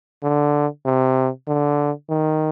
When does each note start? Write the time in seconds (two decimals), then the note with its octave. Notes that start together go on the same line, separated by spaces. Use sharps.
0.23 D3
0.85 C3
1.48 D3
2.09 D#3